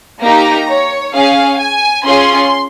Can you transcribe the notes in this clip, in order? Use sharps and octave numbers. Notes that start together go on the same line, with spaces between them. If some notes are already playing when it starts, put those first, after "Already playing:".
A#3 D#4 G4 A#5
C#5
C#4 G#4 F5
G#5
C#4 F4 G#4 C6